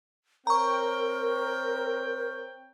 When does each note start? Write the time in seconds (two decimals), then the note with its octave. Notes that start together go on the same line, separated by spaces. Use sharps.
0.47 C4 A#4 C#5 G5 A#5 C#6